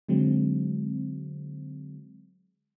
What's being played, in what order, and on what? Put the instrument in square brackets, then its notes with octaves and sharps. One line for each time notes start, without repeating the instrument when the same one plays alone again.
[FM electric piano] D3 F#3 G#3 C4